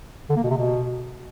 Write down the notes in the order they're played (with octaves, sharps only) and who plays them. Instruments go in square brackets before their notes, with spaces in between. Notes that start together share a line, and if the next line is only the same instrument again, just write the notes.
[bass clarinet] D3
A#3
B2
C3
B2